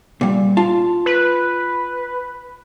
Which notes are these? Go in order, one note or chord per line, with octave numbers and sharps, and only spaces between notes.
A#2 G3
F4 A5
B4